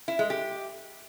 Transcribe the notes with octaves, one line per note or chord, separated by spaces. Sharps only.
E4
G#3
G4